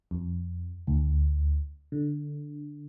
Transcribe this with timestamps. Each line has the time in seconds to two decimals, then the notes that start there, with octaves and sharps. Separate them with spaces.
0.11 F2
0.87 D2
1.92 D3